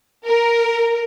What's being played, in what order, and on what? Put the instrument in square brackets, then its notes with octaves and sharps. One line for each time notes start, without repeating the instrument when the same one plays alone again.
[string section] A#4